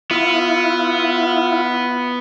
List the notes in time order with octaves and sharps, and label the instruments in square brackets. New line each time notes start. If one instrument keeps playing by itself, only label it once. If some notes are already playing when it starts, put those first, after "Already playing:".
[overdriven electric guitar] B3 [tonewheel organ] E4 F4